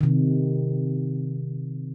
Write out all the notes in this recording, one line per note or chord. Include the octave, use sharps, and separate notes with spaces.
C3 D#3